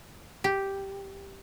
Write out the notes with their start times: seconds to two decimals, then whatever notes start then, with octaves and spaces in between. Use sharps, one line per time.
0.44 G4